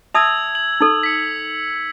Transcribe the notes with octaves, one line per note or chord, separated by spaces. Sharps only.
E5 A5 D#6 E6 G#6 F7
F#7
D#4 A4
B6 C#7